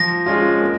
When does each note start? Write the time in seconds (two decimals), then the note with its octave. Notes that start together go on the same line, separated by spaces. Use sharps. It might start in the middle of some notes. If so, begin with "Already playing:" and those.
Already playing: F3 A#6
0.26 G#3 C#4 F4
0.61 A#3